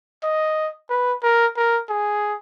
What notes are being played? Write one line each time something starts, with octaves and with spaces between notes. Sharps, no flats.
D#5
B4
A#4
A#4
G#4